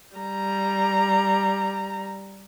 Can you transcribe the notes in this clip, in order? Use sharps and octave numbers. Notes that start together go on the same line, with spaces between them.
G3 A#5